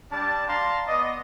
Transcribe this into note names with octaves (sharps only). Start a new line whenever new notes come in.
G3 D4 A5
D5 F5 A5 A#5 C6
B3 D5 D#5